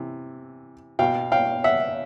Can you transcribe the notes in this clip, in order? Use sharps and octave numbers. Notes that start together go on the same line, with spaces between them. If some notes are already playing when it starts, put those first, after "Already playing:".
Already playing: C3 E3
B2 F5 G5
F5 G5
E5 F#5